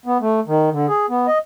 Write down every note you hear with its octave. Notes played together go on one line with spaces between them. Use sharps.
B3
A3
D#3
D3
G#4
B3
D#5